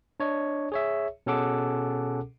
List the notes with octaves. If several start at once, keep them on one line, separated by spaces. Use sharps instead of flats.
D4 C#5 D#5
G#4 C#5 E5
B2 C#4 G#4 A4 F#5 D6